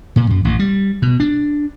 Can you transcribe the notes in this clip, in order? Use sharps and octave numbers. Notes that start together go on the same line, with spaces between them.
A#2
F#2
A1
G3
B2
D4